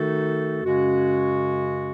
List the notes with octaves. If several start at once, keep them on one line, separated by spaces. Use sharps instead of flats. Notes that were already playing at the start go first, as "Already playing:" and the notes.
Already playing: D#3 A3 D#4 F#4 A4
F#2 C#3 G#3 C#4 F#4